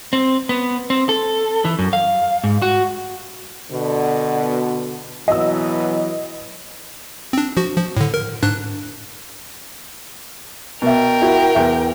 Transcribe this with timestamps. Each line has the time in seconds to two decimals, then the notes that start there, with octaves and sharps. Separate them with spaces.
0.13 C4
0.49 B3
0.90 C4
1.09 A4
1.65 E3
1.79 F#2
1.93 F5
2.44 G#2
2.62 F#4
3.70 B2 D3
5.28 B2 E3 F#3 D#5 E6
7.33 C4 D4
7.57 F3 F#4
7.77 F3
7.97 A2 D3
8.14 A#4
8.43 G#2 D4 F#6
10.82 B2 A#4 E5 G5
11.22 E4 F#4
11.55 E2 E5